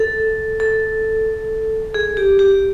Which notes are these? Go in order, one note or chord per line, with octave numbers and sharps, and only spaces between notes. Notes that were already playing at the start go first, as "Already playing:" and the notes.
Already playing: A4
A4
G#4
G4
G4